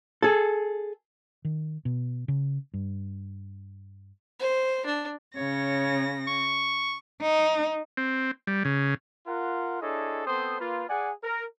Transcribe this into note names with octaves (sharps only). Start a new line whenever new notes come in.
G#4 A4
D#3
B2
C#3
G2
C5
D4
C#3 C#5 A#6
C#6
D#4
C4
G3
C#3
F4 A#4 F#5
D4 E4 G#4 A4 C#5 D#5
B3 C4 A4 C5 D#6
A#3 F4 B4
G#4 D5 F#5 G#5
A#4